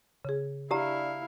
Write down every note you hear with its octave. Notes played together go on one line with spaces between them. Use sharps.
C#3 G#4
D4 E4 G4 F5 A#5